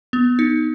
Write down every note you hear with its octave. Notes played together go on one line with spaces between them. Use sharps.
B3
D#4